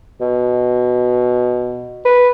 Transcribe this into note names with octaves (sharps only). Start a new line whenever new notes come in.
B2
B4